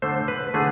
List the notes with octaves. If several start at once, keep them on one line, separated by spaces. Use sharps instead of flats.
D3 A3 C5
B4
D3 A3 G#4